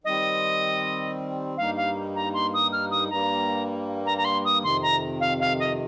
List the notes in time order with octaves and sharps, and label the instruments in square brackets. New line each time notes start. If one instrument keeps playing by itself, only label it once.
[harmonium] D#3 G3 C4 [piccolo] D#5
[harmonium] G2 G3 A#3 D#4 [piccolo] F5
[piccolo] F5
A#5
C6
D#6
F6
D#6
[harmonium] G2 G3 A#3 [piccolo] A#5
[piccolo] A#5
A#5
C6
D#6
[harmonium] F2 C3 D#3 [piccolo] C6
[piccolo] A#5
F5
F5
D#5